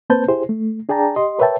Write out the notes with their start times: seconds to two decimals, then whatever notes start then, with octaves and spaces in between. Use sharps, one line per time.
0.10 A#3 C4 B4 C5 A5 G6
0.28 E4 G4 G#4 C5
0.49 A3
0.89 D4 G#4 D5 G5 A5 A#5
1.16 G4 D#5 C6
1.39 A#4 B4 C#5 E5 G5 A5